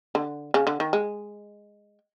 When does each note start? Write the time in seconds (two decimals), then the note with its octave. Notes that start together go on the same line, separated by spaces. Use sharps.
0.15 D3
0.54 C#3
0.67 D3
0.80 D#3
0.93 G#3